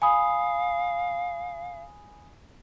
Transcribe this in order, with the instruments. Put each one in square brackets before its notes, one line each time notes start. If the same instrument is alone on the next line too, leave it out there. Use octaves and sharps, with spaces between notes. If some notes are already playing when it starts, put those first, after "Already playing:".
[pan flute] F5 [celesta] G#5 B5 D#6